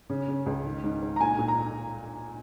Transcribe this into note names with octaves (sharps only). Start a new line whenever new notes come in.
C#3
C#3
C#2
D#3
G#2
G#2
A#5
A#2 G#5
A#2
A#5